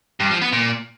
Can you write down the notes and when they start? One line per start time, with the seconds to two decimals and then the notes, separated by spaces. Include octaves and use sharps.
0.20 G2
0.31 F3
0.41 B3
0.52 A#2